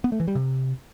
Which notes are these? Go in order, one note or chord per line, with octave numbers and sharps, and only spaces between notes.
B3
A3
E3
G3
C3